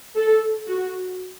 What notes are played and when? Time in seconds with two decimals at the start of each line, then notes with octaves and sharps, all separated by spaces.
0.16 A4
0.67 F#4